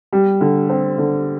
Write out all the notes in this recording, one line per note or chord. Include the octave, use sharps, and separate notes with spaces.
G3
D3
C4
D3